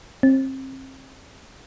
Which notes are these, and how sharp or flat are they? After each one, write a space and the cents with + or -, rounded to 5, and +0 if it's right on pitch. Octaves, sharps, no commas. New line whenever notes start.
C4 +30